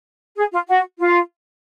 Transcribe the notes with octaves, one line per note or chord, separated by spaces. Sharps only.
G#4
F4
F#4
F4